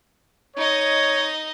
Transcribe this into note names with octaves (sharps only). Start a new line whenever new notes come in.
D#4 C#5 D#5